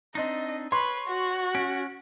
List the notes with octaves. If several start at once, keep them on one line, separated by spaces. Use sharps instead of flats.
C4 D4 D#4 D#5
B4 C#5 C6
F#4
C#4 D7